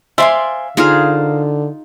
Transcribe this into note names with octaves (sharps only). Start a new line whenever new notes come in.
C5 D5 E5 F5 G#5 C6
D3 D#4 F4 G#4 A#4 C5 F5